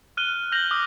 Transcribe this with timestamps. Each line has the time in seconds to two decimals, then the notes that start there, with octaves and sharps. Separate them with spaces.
0.17 F6 F#6 D#7 G7
0.52 F6 G6 A#6 F7 F#7
0.71 D6 D#6 F6 F#6